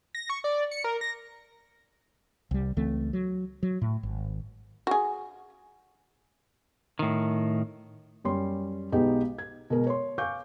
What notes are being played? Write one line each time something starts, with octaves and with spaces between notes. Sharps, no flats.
A#6
C#6
D5
C#7
A#4
A#6
C2 G3
C#2 E3 A3 C4
F#3
F#3
A2
G#1
F#4 G#4
A2 D#3
F#2 G3 C#4 C6
B1 G#3 B3 D#4 G4
G#6
B2 G#3 G#4 A#4
C#5 C6
F5 G#5 C#6 D6 G6